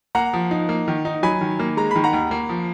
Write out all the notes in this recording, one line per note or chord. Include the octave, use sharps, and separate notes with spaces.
A#3 F#5 A#5
F3
D#4
A#3
D#3
D#4
F#3 G#5 B5
D#3
A#3
G#3 A#5
D#3 B5
F#5 A#5
D#2
A#3
F3